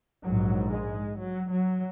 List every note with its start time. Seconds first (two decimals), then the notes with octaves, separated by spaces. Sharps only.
0.23 A#1 G#2 F#3
0.71 G#3
1.19 F#3
1.50 F#3